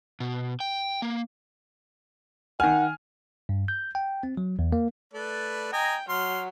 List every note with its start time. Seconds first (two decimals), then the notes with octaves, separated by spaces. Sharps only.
0.20 B2
0.60 G5
1.02 A#3
2.60 D#3 F#5 G#5 F6
3.49 G2
3.68 G6
3.95 G5
4.23 C4
4.37 F#3
4.59 E2
4.72 A#3
5.14 A3 B4 D5
5.73 D#5 G5 G#5 A#5
6.09 F#3 C6 F6